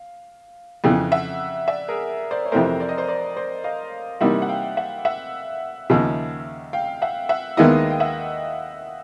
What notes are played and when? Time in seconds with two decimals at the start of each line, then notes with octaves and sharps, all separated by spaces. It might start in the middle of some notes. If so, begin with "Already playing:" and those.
Already playing: F5
0.84 F2 C#3 E3
1.12 E5 F#5
1.68 D5 E5
1.88 G#4 A#4
2.31 C5 D5
2.46 C#5
2.52 F2 C3 E3 A3 A#4 C5
2.80 D5
2.89 D#5
2.97 C5 D5
3.08 C5 D5
3.36 C5 D5
3.64 D#5 F5
4.21 C3 E3 G3 A#3 D#4 E5 F#5
4.42 F#5
4.49 F5 G5
4.77 E5 F#5
5.05 E5 F#5
5.90 D#2 C#3 F3
6.73 F5 G5
7.02 E5 F#5
7.29 E5 F#5
7.57 D#2 D#3 G#3 B3 E4 D#5 F5
7.90 G5
8.00 E5 F#5